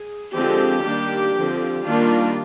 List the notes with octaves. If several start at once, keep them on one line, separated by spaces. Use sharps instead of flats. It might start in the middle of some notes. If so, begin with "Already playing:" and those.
Already playing: G#4
D3 F3 G#3 C4 G4
D#3 G3 A#3 D4
D3 F3 C4
D#3 G3 A#3 D4 F4